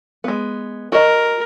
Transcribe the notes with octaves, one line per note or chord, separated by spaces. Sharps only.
G#3 B3
F#4 A#4 D#5